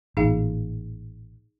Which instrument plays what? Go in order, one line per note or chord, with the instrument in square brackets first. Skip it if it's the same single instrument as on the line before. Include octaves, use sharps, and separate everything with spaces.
[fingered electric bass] A1 A#2 [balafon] D#4 G#4 F5